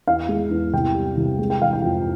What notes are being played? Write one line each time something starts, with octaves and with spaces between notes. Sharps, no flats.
E2 F5
G#3
E2
C2 G5
G3
C2
G#3
G5
E3 F5
G5
F2